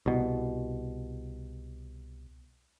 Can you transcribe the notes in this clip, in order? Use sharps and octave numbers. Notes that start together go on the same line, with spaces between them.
C2 B2